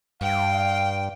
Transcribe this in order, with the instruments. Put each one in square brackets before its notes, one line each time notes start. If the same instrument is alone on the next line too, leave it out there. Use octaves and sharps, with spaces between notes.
[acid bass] G2 [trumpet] F5 [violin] G5